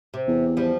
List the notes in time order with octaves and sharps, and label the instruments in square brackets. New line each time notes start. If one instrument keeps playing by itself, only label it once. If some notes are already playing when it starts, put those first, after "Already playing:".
[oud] C3
[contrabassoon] E2
[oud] F3 G3